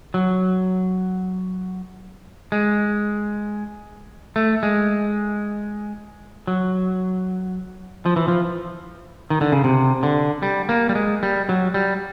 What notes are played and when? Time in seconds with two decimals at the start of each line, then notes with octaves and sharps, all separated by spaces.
0.14 F#3
2.52 G#3
4.36 A3
4.63 G#3
6.47 F#3
8.06 F3
8.16 E3
8.28 F3
9.30 D#3
9.41 D3
9.52 C#3
9.64 C3
10.03 D3
10.43 G3
10.69 A#3
10.89 G3
10.95 G#3
11.23 G3
11.49 F#3
11.74 G3